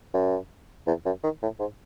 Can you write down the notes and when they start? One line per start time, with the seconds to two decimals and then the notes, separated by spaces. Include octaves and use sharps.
0.14 F#2
0.87 E2
1.06 F#2
1.24 D#3
1.42 A2
1.60 G#2